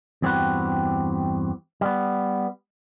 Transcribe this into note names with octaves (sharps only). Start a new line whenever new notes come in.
E2 G2 C4 F#4 G4 B4
G3 B3